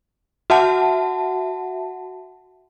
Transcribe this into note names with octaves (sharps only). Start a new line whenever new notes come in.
F#4 E5 F#5 A5